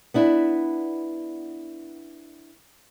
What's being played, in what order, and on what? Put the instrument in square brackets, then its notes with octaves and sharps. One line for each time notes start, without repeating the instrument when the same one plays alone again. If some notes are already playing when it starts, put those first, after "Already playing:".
[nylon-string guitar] B3 D4 E4